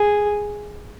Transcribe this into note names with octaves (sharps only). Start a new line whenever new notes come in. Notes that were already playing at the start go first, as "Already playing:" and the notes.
Already playing: G#4